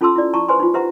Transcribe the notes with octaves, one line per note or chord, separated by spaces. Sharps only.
C#4 F4 A4 A5 C6 E6
E4 D5
E4 A5 A#5 C#6
B4 C5 G#5 C6
D#4 F4
G4 B4 C5 E5 F#5 A#5